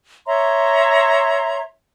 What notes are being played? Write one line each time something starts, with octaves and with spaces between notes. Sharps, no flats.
C#5 E5 A#5 C6